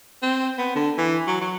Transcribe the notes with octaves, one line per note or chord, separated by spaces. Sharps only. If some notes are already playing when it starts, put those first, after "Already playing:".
C4
B3
D3
E3
F#3
F#3